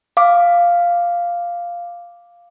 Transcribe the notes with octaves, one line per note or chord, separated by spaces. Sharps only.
F5 D6